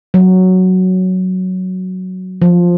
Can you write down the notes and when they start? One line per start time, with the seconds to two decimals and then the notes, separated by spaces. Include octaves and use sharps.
0.14 F#3
2.42 F3